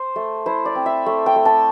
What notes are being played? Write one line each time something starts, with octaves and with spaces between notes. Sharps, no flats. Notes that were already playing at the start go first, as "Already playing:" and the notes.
Already playing: C5
A3
E4 C5
D5
C4
E5
A3
G5
A3
A5